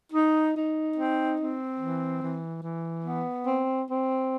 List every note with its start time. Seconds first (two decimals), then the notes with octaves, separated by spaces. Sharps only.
0.13 D#4
0.55 D#4
0.96 C4
1.39 C4
1.80 E3
2.22 E3
2.62 E3
3.04 B3
3.46 C4
3.87 C4